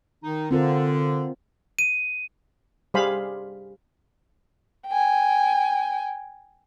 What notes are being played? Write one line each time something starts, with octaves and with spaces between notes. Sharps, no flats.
D#3 D#4
D3 C4 F4 A#4
D#7
G3 G#4 C5 F5 B5
G5 G#5